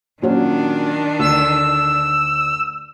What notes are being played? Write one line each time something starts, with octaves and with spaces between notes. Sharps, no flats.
A#2 D#3 F#3 C#4 D4
D2 D3 E6